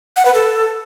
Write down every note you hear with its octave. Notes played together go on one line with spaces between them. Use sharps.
F#5
B4
A4